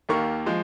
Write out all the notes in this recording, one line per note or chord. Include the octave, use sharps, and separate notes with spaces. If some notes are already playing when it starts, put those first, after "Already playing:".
D#2 D#3 A#3 C#6
F3 G#3